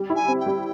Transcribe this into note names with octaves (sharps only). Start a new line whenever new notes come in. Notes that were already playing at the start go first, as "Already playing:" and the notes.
Already playing: G3
E4
G#5
C4
G5
G3